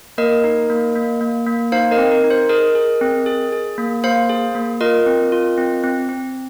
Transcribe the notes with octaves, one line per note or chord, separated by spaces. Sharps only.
A#3 A#4 D#5
D#4
A#3
A#3
A#3
A#3
D#4 C5 F5
A#4 D#5
C4
A#4
D#4
C5
G#4 A#4 D#5
G#4
C4
G#4
G#4
A#3
A#3 C5 F5
G#4
A#3
F4 A#4 D#5
C4
F4
C4
C4
C4